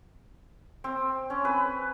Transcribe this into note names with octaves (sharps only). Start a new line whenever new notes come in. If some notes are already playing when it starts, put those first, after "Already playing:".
C4
C#4
B4